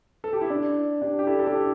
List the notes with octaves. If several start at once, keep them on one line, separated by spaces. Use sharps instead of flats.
A4
G4
E4
D4
D4 G4
G4
E4 A4
A4
D4 G4